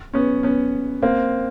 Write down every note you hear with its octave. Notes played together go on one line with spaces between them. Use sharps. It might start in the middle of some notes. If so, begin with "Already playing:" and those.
B3 C#4
B3 C#4
A#3 C4